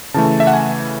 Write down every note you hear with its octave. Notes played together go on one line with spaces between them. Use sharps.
C#3 E3 A3 A5
E5
F#5
G#5